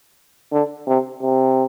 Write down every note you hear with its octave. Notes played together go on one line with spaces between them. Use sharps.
D3
C3
C3